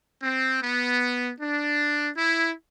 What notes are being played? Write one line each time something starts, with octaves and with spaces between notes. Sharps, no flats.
C4
B3
D4
E4